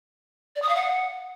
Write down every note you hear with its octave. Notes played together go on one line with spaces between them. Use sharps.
D5
D#6
F5
F#5